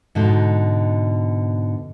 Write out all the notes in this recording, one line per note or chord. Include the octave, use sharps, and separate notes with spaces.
G#2 B2 D3 D#4